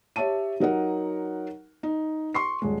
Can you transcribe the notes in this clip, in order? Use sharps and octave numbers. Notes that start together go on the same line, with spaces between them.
G4 C#5 E5 A5 D#7
F#3 D#4 A#4 F#5
D#4
C6 C#6 C7
D#1 G#3